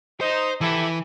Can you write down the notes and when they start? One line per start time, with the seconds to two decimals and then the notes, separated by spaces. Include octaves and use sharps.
0.21 D#4 C5
0.61 E3 E4 G4 A4